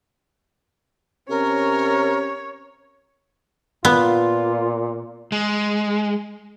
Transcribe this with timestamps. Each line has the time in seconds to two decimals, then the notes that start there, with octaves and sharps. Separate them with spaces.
1.29 C3 C#4 A#4 C#5
3.85 A#2 B3 F4
5.32 G#3